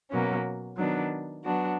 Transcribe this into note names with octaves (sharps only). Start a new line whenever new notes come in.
B2 F#3 A#3 C#4
D#3 F#3 B3 D4
F#3 B3 D4 F#4